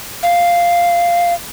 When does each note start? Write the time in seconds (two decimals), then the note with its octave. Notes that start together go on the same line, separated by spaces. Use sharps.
0.23 F5